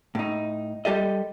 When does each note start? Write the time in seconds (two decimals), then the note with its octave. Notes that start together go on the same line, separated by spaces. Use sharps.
0.15 A2 D#4
0.85 G3 G4 A4 D#5